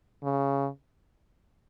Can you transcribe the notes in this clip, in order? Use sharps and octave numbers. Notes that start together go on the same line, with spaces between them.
C#3